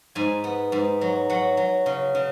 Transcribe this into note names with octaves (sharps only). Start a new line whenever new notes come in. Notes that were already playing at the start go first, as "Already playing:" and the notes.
G#2 G#5
B3
G#2
F#3
F#3 F#5
F#3
C#3
C#3